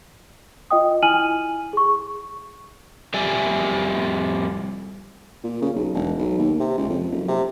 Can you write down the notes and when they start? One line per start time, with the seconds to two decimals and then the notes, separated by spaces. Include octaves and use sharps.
0.71 F4 D#5 G5 D#6
1.03 E4 G#5 F6 D#7 F#7
1.73 G#4 C#6
3.14 F2 G3 G4 D5 E5 G#5
5.44 A#2
5.62 C#3
5.75 B1
5.94 E1
6.19 B1
6.38 D#2
6.60 C3
6.78 C#2
6.89 F2
7.12 F#1
7.28 C3